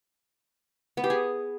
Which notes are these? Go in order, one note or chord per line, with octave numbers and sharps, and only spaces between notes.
B3
G4
G#4